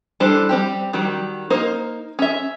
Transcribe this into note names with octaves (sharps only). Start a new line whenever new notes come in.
E3 G3 D4 A4 C5
G3 C4 G4
D#3 F#3 G3
A#3 D#4 A#4 C5
C#4 E5